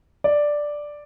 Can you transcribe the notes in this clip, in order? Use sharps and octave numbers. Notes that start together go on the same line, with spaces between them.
D5